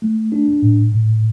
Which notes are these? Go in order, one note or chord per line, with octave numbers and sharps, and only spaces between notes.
A3
D4
A2
A2